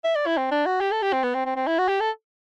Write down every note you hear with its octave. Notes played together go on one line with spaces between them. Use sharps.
E5
D5
E4
C4
D4
F#4
G4
A4
G4
C4
B3
C4
C4
C4
E4
F#4
G4
A4